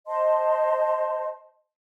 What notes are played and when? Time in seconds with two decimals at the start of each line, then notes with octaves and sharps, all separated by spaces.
0.07 C5 D#5 A5 C6